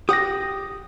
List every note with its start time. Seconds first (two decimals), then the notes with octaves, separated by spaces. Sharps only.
0.09 G4 F#5 D#6 A#6